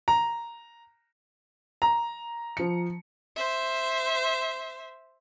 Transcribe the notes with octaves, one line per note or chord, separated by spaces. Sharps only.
A#5
A#5
F3 C#7
C5 E5